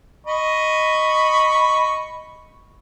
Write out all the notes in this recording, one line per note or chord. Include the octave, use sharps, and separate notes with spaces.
D#5 B5 C#6